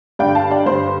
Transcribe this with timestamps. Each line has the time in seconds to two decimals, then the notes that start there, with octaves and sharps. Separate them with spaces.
0.19 G2 D3 D5 G5
0.35 F5 A5
0.51 D5 G5
0.66 G2 D3 C5